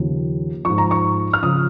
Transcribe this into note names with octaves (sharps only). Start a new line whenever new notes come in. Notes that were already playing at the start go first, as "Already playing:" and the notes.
Already playing: D#2 C#3 F3
G#2 F3 C#6
A#5
C#6
F6
C#3 F3 D#6